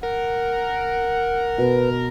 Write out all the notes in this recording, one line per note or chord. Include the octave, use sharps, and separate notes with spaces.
A#4 F#5
B2 B4